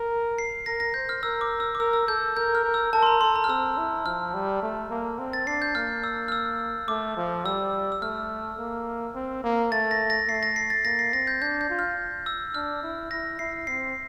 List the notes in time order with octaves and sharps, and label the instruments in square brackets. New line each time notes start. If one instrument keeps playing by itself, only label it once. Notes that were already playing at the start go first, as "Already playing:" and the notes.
Already playing: [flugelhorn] A#4
[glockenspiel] C7
[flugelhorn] A#4 [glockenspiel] A#6
[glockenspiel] A#6
[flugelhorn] C5 [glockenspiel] G6
[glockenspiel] F6
[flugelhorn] A#4 [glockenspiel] E6
[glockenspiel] D6
E6
D6
[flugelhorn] A#4 [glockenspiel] E6
[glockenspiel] E6
[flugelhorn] A4 [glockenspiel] G6
[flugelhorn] A#4 [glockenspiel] G6
[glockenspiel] F6
[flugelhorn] A#4
[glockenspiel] E6
[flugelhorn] A#4 [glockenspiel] A5
[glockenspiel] C6
A#5
[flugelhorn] A4 [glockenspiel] C6
[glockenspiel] A#5
F6
[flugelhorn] C4 [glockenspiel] E6
[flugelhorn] E4
[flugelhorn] F3 [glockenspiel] F6
[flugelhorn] G3
A3
A#3
C4
[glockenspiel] A6
[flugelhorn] D4 [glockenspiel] C7
[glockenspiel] G6
[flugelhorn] A#3 [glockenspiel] F6
[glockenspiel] E6
F6
E6
[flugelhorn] A3 [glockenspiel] D6
[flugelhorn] F3
[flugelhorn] G3 [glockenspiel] E6
[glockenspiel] E6
[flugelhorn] A3 [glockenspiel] F6
[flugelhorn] A#3
C4
A#3
[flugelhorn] A3 [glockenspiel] A6
[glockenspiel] A#6
A#6
[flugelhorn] A3 [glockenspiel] C7
[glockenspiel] A#6
C7
A6
[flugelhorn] A#3 [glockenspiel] A#6
[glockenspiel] C7
[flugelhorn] C4 [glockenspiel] A#6
[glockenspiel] G6
[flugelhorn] D4 [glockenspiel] G6
[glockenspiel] G6
[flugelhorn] F4
[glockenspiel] F6
E6
[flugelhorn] D4 [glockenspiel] F6
[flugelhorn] E4
[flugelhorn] E4 [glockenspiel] A#6
[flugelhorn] E4 [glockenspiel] C7
[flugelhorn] C4 [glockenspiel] C7